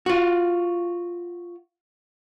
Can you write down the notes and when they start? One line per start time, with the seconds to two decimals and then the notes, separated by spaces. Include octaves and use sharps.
0.06 F4 F#4